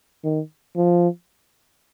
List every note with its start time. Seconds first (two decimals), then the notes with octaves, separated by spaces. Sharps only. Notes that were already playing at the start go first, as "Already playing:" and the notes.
0.24 D#3
0.76 F3